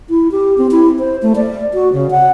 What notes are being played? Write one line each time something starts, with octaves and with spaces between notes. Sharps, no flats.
E4
G4
C4
E4
C5
A3
D5
F#4
C#3
F#5